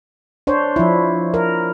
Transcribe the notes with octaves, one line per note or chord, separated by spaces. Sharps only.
D4 C5 C#5
F3 E4
A#4